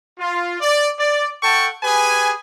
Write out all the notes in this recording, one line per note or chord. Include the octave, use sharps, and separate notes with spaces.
F4
D5
D5
A4 F#5 G5 A5 C#6
G4 G#4 B4 G#5